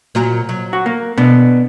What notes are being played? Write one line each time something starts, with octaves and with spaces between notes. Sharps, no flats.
A#2 F#3 F#4
F#3
F#4
A#3
B2 B3 D4